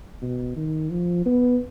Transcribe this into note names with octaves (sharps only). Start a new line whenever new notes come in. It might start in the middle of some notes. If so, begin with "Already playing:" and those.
B2
D#3
F3
B3